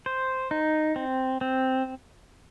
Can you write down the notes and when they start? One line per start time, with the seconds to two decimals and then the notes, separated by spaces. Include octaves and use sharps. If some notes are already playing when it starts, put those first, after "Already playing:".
0.06 C5
0.51 D#4
0.96 C4
1.41 C4